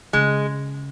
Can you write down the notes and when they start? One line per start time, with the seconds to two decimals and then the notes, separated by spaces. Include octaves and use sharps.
0.13 C#3 G#3